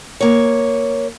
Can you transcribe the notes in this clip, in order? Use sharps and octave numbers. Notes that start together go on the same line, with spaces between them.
A#3 C#5